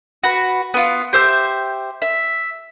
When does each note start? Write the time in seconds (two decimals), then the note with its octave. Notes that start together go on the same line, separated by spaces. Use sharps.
0.23 F#4 B4
0.74 B3 F4
1.13 G4 C5 E5 G6
2.02 E5